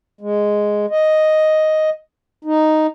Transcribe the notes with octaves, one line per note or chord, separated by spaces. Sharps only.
G#3
D#5
D#4